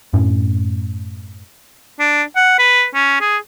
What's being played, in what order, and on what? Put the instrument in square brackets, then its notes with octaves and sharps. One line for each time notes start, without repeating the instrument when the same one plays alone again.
[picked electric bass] F#2 A2 C#4
[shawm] D4
F#5
B4
C#4
G#4